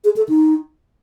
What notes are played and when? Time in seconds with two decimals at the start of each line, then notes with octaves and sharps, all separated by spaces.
0.04 G#4
0.16 A4
0.29 D#4